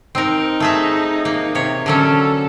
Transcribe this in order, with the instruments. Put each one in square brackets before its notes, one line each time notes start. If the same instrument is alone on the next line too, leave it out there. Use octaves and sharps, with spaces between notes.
[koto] C4 A#4 [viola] D#4
[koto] A3 G#4 E5
A#3
C3 C#5
[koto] D3 F#3 C#4 [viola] A4